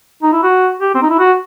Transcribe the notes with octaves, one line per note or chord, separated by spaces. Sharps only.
D#4
E4
F#4
G4
C4
D#4
E4
F#4